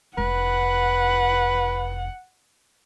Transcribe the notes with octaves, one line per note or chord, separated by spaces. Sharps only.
F1 B4 F#5